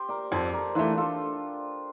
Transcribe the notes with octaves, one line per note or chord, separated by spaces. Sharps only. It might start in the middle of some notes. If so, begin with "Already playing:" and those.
Already playing: G4 C5
A#4 D5
F2 A4 C5
A#4 D5
E3 A3 D4 F4
F4 A4